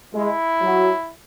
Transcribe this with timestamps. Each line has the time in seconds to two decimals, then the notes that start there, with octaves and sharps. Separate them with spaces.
0.14 G#3 E4
0.62 F#3